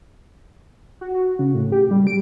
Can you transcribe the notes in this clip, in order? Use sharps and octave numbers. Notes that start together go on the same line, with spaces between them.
F#4
F#4
C#3
A2
G4
G3
D7